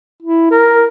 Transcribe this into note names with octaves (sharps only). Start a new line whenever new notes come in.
E4
A#4